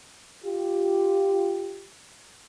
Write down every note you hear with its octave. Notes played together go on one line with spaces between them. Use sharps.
F4 G4